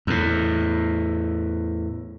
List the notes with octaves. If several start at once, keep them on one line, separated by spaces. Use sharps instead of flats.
E2 A2